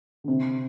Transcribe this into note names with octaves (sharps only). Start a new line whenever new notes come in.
D3
C3